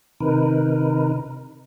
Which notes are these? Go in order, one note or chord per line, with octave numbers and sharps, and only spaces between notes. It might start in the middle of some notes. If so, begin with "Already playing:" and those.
C3 D#3 D#4 A#4 B4